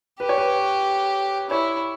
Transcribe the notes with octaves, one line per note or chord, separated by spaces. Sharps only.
G4 B4
C#5
B4
E4 C#5